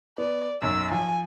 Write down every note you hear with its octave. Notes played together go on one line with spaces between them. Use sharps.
B3 D5
B1 F#2 E6
F3 G#5